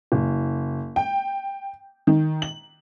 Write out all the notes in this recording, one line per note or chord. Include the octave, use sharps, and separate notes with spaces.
F#1
G5
D#3
F#7